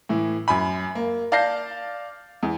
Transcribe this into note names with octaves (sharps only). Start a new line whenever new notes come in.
A2 E3
F#2 G#5 B5
A#3
D5 F5 A5 G6 A#6 C7
E2